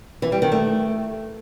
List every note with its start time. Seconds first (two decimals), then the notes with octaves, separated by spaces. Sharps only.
0.22 E3
0.32 G3
0.42 D#3
0.52 A3